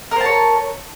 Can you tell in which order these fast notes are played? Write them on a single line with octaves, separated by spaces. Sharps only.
A#4 C5 A5 C#5